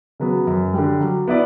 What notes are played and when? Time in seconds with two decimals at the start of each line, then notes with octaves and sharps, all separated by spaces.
0.20 C#3 F#3 B3
0.47 F#2
0.73 D3 G3
1.01 F#3
1.28 B3 E4 B4 D5